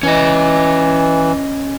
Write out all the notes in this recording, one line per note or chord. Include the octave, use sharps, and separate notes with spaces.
E3 C#4 D#5